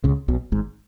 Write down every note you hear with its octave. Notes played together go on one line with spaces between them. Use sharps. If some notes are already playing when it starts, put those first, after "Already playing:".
C#2 C#3
B1 B2
G#1 G#2